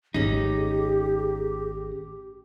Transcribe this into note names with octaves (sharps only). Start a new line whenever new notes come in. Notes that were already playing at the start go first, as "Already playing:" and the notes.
G#1 A3 C#4 D#4 G4 G#4